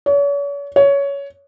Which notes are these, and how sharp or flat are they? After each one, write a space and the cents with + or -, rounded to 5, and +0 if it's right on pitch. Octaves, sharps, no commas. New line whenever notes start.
C#5 +40
C#5 +15